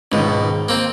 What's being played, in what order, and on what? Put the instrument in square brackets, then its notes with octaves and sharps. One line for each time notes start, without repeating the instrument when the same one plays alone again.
[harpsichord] C#2 B2 [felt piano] G#2 D#3
[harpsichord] A#3 C4